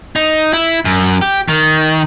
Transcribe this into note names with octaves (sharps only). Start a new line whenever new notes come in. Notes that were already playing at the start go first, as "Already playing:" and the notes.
D#4
E4
F#2
G4
D#3